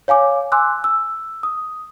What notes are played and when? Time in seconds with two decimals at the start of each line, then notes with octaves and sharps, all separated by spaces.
0.08 C#5 F5 G#5 D6
0.52 G#5 C6 D6 E6 F#6
0.84 E6
1.43 D#6